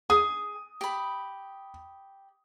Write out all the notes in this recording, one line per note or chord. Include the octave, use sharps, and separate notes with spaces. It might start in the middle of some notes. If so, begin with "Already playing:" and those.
G#4 D#6
G4 B5